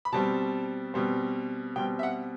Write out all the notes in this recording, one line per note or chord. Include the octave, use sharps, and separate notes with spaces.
B5
B2 G3 C4 A5
B2 G3 C4
B2 G3 C4 G5
E5
F#5